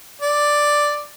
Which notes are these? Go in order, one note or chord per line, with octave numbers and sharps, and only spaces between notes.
D5